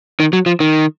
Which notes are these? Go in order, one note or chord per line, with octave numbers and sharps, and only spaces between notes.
D#3
F#3
F3
D#3